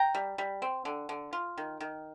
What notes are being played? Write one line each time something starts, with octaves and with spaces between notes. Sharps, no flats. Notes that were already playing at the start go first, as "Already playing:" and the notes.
Already playing: G5 A#5
G3
G3
C4
D3
D3
F4
D#3
D#3